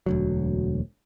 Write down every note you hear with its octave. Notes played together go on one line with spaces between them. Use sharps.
E1 D2 F#3